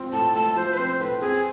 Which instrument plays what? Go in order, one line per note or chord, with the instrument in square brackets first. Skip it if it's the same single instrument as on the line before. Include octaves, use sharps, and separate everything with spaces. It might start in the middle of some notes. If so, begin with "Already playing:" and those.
Already playing: [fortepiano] F3 C4
[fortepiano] A2 [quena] A5
[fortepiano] A3 [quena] A5
[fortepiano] F3 [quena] C5
[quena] B4
[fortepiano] C4 [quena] C5
[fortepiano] A2 [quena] B4
[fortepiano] C4 [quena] G#4